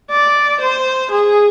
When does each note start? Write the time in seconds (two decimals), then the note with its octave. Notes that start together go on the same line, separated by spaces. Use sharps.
0.11 D5
0.61 C5
1.11 G#4